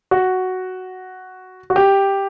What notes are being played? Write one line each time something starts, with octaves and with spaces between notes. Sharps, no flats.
F#4
F#4
G4